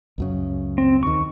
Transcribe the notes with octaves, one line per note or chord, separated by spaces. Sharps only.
C#2 F#2 C#3
C4
D#2 D#3 C#6